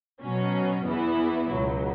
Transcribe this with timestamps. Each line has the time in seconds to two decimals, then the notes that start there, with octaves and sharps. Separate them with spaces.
0.21 B2 F#3 C#4
0.85 E2 E3 B3 E4
1.50 C#2 B2 F#3